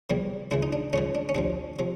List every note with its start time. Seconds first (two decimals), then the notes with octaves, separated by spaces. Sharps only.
0.10 E2 C3 E3 G3
0.51 C#2 C#3 E3 E4
0.63 D#4
0.73 D4
0.93 C#2 C#3 E3 C#4
1.15 D4
1.29 C#4
1.35 D2 C3 F3 D4
1.79 C3 F3